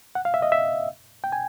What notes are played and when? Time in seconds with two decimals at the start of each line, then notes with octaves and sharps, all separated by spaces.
0.15 F#5
0.25 F5
0.34 E5
0.42 D#5
0.52 E5
1.24 G5
1.32 G#5